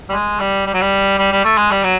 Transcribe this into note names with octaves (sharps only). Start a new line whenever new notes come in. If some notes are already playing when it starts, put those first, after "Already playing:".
G3
G#3
G3
G3
F#3
G3
G3
G3
A3
G#3
G3
F#3